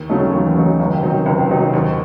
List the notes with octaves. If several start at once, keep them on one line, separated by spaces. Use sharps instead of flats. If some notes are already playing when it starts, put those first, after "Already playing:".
Already playing: D#2
C#3 F#3 A3 D#4
D#2 E3
C#3 F#3 A3 D#4
C#2 D#3
C3 F#3 C4 D#4
C#2
C3 F#3 C4 D#4
D#2